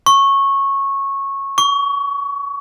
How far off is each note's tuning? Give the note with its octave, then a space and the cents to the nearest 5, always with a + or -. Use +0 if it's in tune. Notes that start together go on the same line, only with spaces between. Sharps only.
C#6 -15
C#6 +30